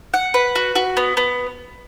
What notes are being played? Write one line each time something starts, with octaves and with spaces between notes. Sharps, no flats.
F#5
B4
F#4
F#4
B3
B3